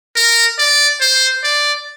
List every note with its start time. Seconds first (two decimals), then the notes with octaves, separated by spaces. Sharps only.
0.16 A#4
0.58 D5
1.01 C5
1.44 D5